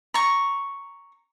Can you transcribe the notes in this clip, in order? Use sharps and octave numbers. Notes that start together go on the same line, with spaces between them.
A#5 C#6